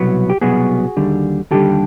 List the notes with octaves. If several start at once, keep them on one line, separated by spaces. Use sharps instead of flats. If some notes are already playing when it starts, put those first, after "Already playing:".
Already playing: C2 B2 F#3 B3
G4
C2 B2 F#3 B3 F#4 G#4
D#2 D3 G3
D#2 D3 G3 G4 A4